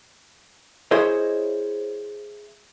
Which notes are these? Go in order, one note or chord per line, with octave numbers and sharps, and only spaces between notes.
E4 G#4 C5 C#5 D#5